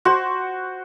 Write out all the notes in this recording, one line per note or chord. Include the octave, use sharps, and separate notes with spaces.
F#4 C5